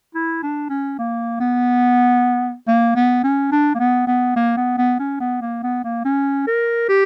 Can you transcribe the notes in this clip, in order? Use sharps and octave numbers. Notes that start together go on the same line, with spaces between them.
E4
D4
C#4
A#3
B3
A#3
B3
C#4
D4
A#3
B3
B3
A#3
B3
B3
C#4
B3
A#3
B3
A#3
C#4
A#4
G4